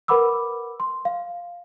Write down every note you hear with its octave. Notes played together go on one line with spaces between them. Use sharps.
A#4 B4 F#5 B5 D6 E6
C6
F5